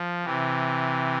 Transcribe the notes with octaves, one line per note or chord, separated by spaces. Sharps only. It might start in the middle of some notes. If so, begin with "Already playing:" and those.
Already playing: F3
C3 E3